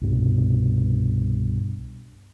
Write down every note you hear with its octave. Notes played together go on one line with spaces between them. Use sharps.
C2 G2 B2